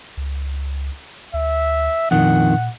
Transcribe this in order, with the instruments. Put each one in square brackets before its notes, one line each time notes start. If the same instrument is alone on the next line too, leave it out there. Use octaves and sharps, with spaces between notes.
[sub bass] C#2
[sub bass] D2 [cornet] E5
[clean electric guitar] F2 D#3 [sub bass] A#2 [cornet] F#5